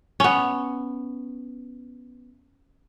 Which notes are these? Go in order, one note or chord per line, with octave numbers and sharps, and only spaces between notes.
B3 C#4